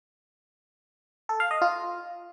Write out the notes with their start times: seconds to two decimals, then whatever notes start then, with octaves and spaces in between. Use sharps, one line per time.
1.29 A4
1.40 F5
1.51 D#5
1.62 F4